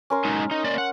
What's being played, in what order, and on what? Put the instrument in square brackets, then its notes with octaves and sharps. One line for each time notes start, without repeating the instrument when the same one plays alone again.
[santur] C#4 A#4 C6
[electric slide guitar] F#3 G#3 D#4
D#4
A#3 D5 D#5
F#5